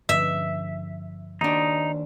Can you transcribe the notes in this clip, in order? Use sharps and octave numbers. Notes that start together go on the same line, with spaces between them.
G2 D3 F3 E5
D#2 D4 D#4